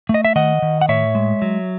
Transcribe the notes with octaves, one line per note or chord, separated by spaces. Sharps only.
A3
D#5
E5
D#3 D#5 F#5
D#3
F#5
A2 C#5 E5
G#3
F#3